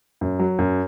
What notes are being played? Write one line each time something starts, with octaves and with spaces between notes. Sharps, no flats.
F#2
F#3
F#2